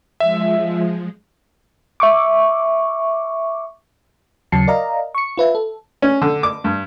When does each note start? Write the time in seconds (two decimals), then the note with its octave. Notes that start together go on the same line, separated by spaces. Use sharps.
0.20 F3 G#3 E5
2.00 E5 C#6 D6
4.52 D#2 C#3 F#3 A5 C7 C#7
4.68 A#4 D5 D#5 F5 A#5
5.15 C#6 C#7
5.37 F4 B4 E5
5.55 A4
6.02 C#4
6.22 D3
6.43 D6
6.64 G2